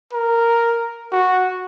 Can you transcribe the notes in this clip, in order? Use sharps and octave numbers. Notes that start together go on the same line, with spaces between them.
A#4
F#4